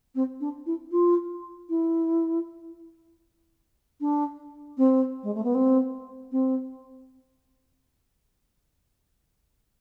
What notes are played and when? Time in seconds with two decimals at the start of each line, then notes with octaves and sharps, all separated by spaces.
0.15 C4
0.41 D4
0.66 E4
0.91 F4
1.69 E4
4.01 D4
4.78 C4
5.23 G#3
5.34 A3
5.44 B3
5.55 C4
6.32 C4